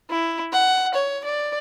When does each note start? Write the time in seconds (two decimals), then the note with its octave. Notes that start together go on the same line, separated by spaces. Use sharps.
0.11 E4
0.53 F#5
0.94 C#5
1.24 D5